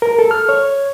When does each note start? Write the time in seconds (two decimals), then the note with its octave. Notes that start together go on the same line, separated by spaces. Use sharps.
0.02 A#4
0.19 A4
0.31 F6
0.49 C#5